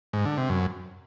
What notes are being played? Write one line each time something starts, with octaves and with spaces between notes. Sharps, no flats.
G#2
D3
C3
F#2